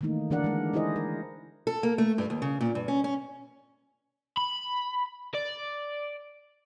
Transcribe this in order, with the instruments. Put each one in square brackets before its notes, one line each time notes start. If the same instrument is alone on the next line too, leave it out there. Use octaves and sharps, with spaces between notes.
[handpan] D#3 E3 A3 A#3 D#4
D3 E3 D4 A#4 D5 F#5
G#3 A#4
D#4 E4 G#4 C5 D#5
A#4
[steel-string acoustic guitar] A4
A#3
A3
G2
D#2
C#3
A#2
G2
C#4
C#4
[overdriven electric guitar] B5
D5